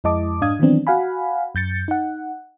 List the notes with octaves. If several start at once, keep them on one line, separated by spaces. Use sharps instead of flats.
F2 G#3 E4 D#5 A5 D6
G#2 D4 F5 D#6 G#6
D#3 E3 F#3 B3 C4 D4
F#4 F5 F#5 G#5 B5
F#2 G6 A6 C#7
D#4 F#5